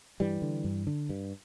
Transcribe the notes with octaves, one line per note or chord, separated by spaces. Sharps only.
G2 E3 G3
D3
G2
D3
G2